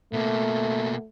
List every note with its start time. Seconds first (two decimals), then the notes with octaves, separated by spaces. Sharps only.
0.13 B2 A3 A#3